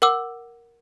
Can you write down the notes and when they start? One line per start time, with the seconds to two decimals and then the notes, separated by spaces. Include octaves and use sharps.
0.02 A#4 F#5 D6 E6